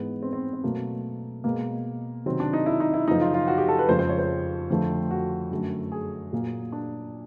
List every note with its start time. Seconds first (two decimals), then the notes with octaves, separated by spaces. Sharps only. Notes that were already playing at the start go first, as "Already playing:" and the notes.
Already playing: G#2 E3 G#3 B3
0.23 C4
0.33 C4
0.53 C4
0.64 B2 F#3 A3 A#3
1.44 B2 G#3 A#3
2.26 C3 D#3 F#3 C4
2.40 D4
2.53 D#4
2.66 E4
2.80 D#4
2.94 E4
3.07 F#2 C#3 F3 D#4
3.21 F4
3.34 F4
3.48 F#4
3.58 G4
3.69 A4
3.79 B4
3.88 F2 C#3 F3 G#3 C5
3.99 C5
4.09 C#5
4.19 C5
4.70 F2 D3 F3 A3
5.11 F#4
5.51 F#2 D3 F#3 A3
5.92 G#4
6.33 A#2 F#3 A#3
6.72 D4